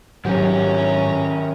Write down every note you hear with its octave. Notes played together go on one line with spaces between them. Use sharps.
G#2 D#3 F#3 C#4 D4 F4 G4 A#5